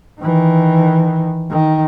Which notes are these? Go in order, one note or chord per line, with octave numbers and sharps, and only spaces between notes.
D#3 E3
D#3